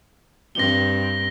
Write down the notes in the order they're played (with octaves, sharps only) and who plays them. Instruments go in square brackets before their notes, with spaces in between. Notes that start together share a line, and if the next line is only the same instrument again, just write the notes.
[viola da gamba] G2 C4 [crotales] A#6 G7